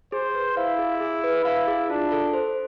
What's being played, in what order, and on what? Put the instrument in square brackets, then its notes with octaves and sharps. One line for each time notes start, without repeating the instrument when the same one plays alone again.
[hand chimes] G#4 [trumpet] C5
[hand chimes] B4
[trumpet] E4 [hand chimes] F5
[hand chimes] G#4
G#4
B4
[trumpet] E4 [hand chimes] F5
[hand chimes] G#4
[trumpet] D4 [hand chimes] F4
[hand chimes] A4
C5